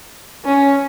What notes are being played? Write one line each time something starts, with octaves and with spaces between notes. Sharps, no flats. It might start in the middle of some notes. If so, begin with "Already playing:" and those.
C#4